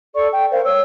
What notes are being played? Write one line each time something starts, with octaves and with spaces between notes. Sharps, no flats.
A4 D5 C#6
G5
A#4 C5 F5
C#5 E6